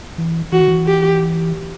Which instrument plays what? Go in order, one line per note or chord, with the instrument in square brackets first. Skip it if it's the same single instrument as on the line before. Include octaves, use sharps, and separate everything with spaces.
[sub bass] E3
[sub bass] E3 [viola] F#4
[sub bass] D#3
E3
[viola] G4